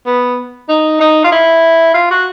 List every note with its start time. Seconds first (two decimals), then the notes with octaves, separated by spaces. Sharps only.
0.06 B3
0.69 D#4
1.00 D#4
1.24 F4
1.32 E4
1.94 F4
2.10 F#4